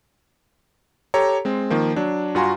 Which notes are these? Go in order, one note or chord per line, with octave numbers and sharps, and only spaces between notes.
G4 A4 C#5 A#5
G#3 C4
D#3 F3 A#3
F#3 D4
G2 F4 F#4 G#5 A#5 C6